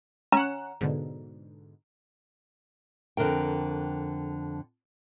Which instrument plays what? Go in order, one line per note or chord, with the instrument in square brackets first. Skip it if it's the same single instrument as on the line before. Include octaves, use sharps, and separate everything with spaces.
[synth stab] C#4 F#5 [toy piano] A#5
[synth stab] G#2 B2 D3
[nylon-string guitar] F2 D3 A#4 G5